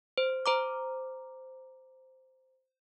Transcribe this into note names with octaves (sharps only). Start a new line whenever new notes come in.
C5
C5 A#5 D6